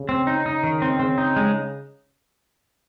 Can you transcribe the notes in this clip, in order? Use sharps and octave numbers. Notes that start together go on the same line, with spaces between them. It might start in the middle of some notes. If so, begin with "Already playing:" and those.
Already playing: C#3
C4
D#4
D#4
D#3
C4
C#3 C4
D#4
G#3